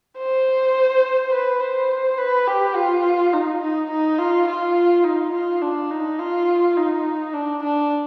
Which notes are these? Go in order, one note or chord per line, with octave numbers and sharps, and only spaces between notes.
C5
B4
C5
B4
G4
F4
D#4
D#4
D#4
F4
F4
D#4
F4
D4
D#4
F4
D#4
D4
D4